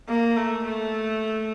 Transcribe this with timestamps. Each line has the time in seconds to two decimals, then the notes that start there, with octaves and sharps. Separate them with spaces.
0.08 A#3
0.36 A3
0.64 A3